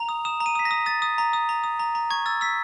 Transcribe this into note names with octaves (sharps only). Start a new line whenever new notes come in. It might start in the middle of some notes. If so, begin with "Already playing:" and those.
Already playing: A#5 F7
D#6
D#6 E7
A#5
D#7
D#6 B6
A#6
D#6
D#6 A6
D#6
A#5
D#6
A#5
D#6
A#5
A#5
C#6 G#6
E6 A6
E6 B6